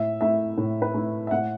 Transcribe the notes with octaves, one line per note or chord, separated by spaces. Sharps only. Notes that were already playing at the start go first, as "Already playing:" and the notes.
Already playing: A2 E5
A3 E4 E5
A2
B4
A3 E4
E5
A2 F#5